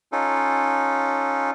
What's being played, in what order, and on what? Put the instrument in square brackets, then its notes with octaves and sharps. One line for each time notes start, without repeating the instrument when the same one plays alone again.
[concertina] C#4 D#4 F4 A4